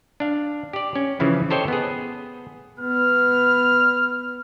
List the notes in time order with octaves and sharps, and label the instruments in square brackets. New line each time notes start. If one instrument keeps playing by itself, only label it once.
[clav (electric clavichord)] D4 F5
G4 D5
C#4
C#3 E3 F3 E4
G4 A4 C5 C#5 D#5 G5
B3 G#4
[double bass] B3 [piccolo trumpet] F6